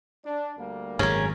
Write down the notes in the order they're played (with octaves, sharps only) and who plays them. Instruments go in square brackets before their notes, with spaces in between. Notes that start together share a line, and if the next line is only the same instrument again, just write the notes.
[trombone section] D4
D2 G3 A#3
[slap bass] G#1 F#2 [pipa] C#4 [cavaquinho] G#4 A#4